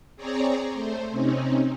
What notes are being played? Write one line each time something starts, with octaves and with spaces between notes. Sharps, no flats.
C4 G#4 C#5 D5 A#5
A3 C5
C3 C4 C#4 D#4